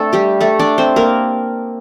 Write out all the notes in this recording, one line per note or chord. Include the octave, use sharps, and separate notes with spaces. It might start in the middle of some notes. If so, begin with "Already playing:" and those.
Already playing: A3 C4 D4 A4
G3 G4
A3 A4
D4 D5
C4 C5
A#3 A#4